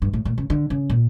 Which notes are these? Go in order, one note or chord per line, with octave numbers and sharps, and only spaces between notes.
G2
A2
A#2
C#3
D3
C#3
A#2